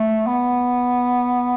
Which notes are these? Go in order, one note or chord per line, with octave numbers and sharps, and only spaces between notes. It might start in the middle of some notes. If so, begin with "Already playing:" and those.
Already playing: A3
B3